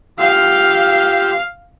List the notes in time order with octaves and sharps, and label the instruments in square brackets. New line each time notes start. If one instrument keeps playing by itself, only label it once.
[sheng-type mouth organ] F4 G4 E6 [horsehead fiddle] F5